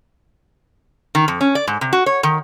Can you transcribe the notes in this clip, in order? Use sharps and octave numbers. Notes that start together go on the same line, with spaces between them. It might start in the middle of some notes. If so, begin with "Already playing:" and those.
D#3
F2
C#4
D5
G#2
C3
F#4
C#5
D#3